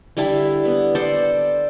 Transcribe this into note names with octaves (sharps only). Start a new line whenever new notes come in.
D3 G3 E4 A5
B3
A4 C5 D5